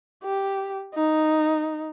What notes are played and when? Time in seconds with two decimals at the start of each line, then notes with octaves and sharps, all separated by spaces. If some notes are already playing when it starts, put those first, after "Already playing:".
0.24 G4
0.94 D#4